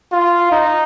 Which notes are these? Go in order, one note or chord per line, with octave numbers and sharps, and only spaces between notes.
F4
D#4